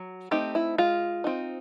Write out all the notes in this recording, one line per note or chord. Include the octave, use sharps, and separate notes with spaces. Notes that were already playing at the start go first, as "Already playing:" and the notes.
Already playing: F#3
A3 C4 D#4 G4
E4
G#3 F4
C4 D#4